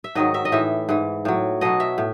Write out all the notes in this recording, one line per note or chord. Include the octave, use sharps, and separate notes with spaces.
E5
G#2 D#3 F#3 D#5
E5
D#5
A2 E3 E5
G#2 E3
A2 F#3
B2 F#3 D#5
E5
A2